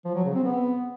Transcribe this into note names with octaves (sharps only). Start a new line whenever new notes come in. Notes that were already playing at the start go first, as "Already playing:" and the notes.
F3
F#3
C#3
C4
B3